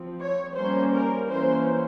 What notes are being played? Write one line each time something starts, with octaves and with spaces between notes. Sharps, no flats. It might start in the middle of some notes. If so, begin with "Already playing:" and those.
Already playing: F3 C4
C#5
G3 A#3 C#4 C5
A#4
E3 A#3 C#4 C5